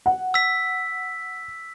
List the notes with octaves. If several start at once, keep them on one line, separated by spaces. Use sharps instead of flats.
F#5
E6 B6